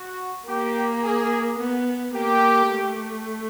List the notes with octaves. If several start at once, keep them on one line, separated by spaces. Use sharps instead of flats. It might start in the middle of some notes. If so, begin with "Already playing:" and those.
Already playing: F#4
A#3 G4
G#4
B3
A#3 G4
A3